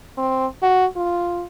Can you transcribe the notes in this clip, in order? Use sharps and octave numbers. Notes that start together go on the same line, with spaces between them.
C4
F#4
F4